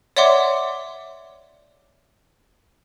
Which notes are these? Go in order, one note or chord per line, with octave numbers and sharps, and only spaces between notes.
C#5 D5 E5 F#5 C6 D6